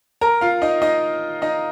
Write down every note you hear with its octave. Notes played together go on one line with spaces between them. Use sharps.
A#4 A#5
F4 F5
D#4 D#5
D#4 D#5
D#4 D#5